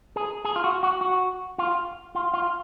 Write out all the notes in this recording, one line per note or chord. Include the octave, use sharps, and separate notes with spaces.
G#4
G#4
F4
F#4
F#4
F#4
F4
F4
F4